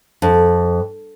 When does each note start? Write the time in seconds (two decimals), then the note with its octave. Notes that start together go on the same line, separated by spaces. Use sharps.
0.22 F2